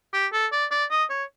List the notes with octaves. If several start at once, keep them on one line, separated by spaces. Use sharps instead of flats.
G4
A4
D5
D5
D#5
C#5